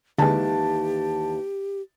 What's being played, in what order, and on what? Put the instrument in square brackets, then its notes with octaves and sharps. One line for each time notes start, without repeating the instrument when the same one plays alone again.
[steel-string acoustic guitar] D#2 E3 [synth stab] D3 G#3 [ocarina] G4 [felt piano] A5